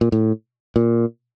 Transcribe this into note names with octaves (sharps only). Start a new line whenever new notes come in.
A#2
A2
A#2